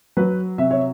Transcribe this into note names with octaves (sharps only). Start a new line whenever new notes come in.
F#3 B4
C3 E5
C#5